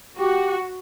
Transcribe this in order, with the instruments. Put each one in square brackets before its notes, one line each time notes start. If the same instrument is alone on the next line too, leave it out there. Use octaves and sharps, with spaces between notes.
[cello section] F#4 [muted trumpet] G4